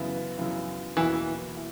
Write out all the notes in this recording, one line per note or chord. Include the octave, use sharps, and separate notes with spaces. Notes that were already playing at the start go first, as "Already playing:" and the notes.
Already playing: F#2 C#3 E3 B3 E4
F#2 C#3 E3 B3 E4
E2 B2 E3 A#3 E4
E4